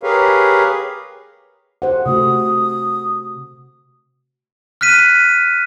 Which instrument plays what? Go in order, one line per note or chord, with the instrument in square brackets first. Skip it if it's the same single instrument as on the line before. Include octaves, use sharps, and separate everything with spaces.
[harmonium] G4 G#4 A#4 B4 C#5 F5
[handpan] G4 C5 F#5
[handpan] C3 A3 F#4 [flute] D#6
[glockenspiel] F6 F#6 B6 D#7